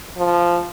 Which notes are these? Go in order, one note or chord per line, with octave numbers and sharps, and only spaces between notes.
F3